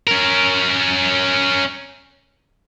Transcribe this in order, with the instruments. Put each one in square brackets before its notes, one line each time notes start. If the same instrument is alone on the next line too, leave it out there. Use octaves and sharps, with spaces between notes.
[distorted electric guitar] C#4 A#4